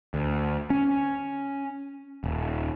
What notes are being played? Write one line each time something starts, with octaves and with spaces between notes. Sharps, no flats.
D2
C#4
D#1